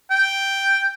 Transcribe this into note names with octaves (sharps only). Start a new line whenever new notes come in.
G5